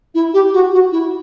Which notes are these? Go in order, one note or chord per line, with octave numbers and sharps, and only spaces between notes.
E4
G4
F#4
F#4
E4